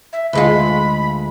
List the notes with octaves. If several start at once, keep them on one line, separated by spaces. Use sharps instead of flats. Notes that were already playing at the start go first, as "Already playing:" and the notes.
E5
D2 G#3 F4 B5